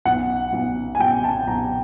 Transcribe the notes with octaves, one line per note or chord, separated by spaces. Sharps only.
B1 F#5
B1
G#5
B1 G5
A5
B1 A#5